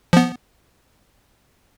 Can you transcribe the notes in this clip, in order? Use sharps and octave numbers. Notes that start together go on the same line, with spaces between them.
F3 B3